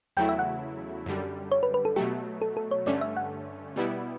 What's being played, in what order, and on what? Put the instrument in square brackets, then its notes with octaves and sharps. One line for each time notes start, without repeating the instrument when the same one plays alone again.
[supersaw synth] E2 C#3 F#3 A3 E4 [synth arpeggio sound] G5
[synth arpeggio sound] E5
F#5
[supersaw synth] F#2 D3 G3
[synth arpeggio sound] C#5
B4
B4
A4
[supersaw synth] B2 F#3 A3 [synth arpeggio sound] G4
[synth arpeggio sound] A4
A4
C#5
[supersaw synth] G2 D3 A3 C#4 [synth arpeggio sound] D5
[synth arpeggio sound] E5
F#5
[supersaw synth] B2 G3 B3 E4